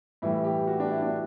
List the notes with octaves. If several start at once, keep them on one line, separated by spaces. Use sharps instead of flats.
A2 E3 G3 E4
G4
F#4
D4
E4
D4